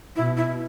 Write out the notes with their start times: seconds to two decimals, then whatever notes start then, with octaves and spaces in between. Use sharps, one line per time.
0.16 B2 E4
0.37 E4